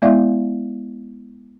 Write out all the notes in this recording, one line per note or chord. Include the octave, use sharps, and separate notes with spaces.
G#3 B3 E4 D5 E5 F5